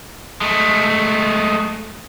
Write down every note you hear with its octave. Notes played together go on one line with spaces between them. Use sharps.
G#3 A3